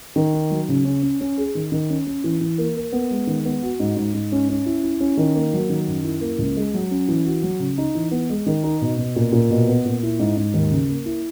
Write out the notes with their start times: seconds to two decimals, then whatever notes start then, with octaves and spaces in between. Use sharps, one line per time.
0.16 D#3
0.33 D#4
0.50 F#3
0.69 C#3
0.85 C#4
1.03 C#4
1.20 C#4
1.38 G#4
1.55 D#3
1.72 D#3
1.89 C#4
2.06 C#4
2.24 E3
2.41 E3
2.58 A#3
2.76 A#3
2.92 B3
3.11 G#3
3.27 D#3
3.45 B3
3.62 F#4
3.80 G#2
3.96 G#2
4.14 G#2
4.32 C#4
4.49 C#4
4.66 E4
4.83 E4
5.00 C#4
5.17 D#3
5.35 A#3
5.53 F#3
5.69 D#3
5.88 F#2
6.04 E4
6.21 A#3
6.38 C#2
6.57 G#3
6.74 F#3
6.91 C#4
7.08 E3
7.25 F#4
7.43 F#3
7.59 C#3
7.78 D#4
7.95 E3
8.11 B3
8.30 G#3
8.46 D#3
8.63 D#4
8.81 B2
8.98 B2
9.16 A#2
9.32 A#2
9.50 B2
9.68 B3
9.85 A#2
10.03 E4
10.19 G#2
10.37 G#2
10.54 D#2
10.71 C#3
10.89 A#3
11.05 E4